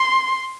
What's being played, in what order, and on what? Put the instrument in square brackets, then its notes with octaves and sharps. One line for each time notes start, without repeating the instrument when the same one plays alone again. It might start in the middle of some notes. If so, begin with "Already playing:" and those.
Already playing: [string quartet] C6